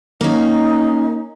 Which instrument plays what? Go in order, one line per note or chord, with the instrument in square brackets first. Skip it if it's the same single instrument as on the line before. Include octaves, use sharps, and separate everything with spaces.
[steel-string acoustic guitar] A#3 C#4 [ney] D#4